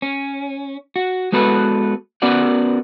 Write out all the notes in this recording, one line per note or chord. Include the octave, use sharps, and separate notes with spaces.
C#4
F#4
G#3 B3 F#4 A4 B4
B3 C#4 F#4 A#4 D5 F#5